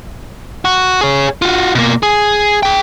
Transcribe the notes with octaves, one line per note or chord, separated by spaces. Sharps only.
F#4
G#4 C#5
F4 F#4
B2 A#3
G#4
G#4 G5